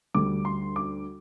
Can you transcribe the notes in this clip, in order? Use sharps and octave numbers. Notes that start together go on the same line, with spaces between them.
D2 D3 G3 D6
C6
D6